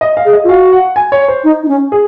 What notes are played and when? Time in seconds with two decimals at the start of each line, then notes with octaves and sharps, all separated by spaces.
0.01 D#5
0.17 F5
0.25 G#4
0.33 D#5
0.44 F4
0.49 F#4 F5
0.72 F#5
0.96 G#5
1.12 C#5
1.28 C5
1.44 D#4
1.63 D#4
1.68 C#4
1.92 G#4